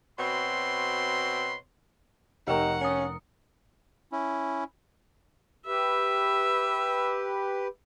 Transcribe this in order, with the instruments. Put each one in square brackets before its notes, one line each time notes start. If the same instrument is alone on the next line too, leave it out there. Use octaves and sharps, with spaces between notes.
[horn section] B2 C4 F#4 C#5 B5 C6
[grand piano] F1 A#4 [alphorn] D#4 [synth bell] G4 G5 C#6 [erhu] F#5
[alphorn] C#4 [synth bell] D#6 C#7
[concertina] C#4 E4
[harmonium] G4 B4 [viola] E5